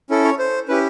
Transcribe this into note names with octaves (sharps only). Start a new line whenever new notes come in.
C#4 E4 A4
C#5
C5
C#4 E4 G4 B4